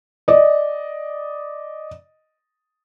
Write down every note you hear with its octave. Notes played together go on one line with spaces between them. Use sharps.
D5 D#5